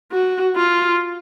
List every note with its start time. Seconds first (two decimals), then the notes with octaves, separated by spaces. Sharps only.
0.12 F#4
0.56 F4